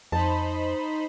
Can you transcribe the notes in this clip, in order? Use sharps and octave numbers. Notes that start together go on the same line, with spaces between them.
F2 D#4 C5 A5 B5